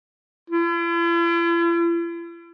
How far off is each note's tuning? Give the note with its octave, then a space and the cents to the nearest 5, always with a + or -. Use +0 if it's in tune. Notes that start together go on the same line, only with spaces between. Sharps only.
E4 +45